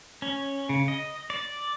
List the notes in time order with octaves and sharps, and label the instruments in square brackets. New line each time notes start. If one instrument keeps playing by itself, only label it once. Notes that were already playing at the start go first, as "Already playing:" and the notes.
[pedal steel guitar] C#4
C#3
D#5
D5